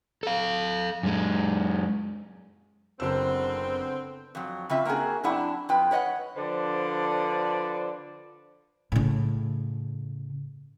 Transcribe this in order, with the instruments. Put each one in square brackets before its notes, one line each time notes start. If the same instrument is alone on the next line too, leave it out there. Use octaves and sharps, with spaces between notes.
[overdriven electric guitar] A4 F5
F#2 G#3
[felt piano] F#1 E6 [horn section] D3 B3 C4
[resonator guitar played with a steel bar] F2 F#3
C#3 C4 F4 E5
A#3 C4 C#4 F#4 G#4
F#2 C4 D4 E4 F#5
F2 F4 B4 G5
B4 C#5 D#5 F5 F#5
[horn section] D3 F3 B4 C5 D5
[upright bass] A2 C#3